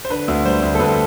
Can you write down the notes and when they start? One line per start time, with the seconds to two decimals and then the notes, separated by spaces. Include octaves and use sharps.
0.05 C5
0.10 D3 B4
0.28 D2
0.45 G3 C5
0.62 D2
0.75 A4
0.79 D2 B4